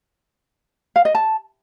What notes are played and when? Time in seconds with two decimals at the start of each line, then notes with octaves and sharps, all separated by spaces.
0.96 F5
1.05 D#5
1.15 A5